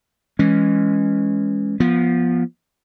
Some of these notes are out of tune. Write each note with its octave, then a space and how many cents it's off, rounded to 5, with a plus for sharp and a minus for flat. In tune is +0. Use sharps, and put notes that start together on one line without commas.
E3 +0 G#3 -5 C#4 +0
F3 +0 B3 -20